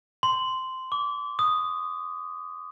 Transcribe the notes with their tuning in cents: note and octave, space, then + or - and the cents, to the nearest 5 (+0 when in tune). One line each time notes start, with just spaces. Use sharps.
C6 -10
D6 -30
D#6 -5